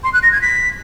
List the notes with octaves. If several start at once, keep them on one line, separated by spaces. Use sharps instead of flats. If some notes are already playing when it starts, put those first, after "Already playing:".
C6
F#6
A#6
G#6
B6